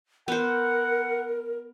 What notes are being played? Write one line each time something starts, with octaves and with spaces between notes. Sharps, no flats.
B3 A#4 C5 F#5